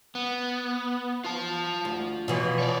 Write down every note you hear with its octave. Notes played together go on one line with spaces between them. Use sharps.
B3
F4 A5
D2
B2 E3 F3
C#5 D5